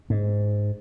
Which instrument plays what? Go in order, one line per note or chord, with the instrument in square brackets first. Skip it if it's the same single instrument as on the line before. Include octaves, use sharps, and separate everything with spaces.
[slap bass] G#2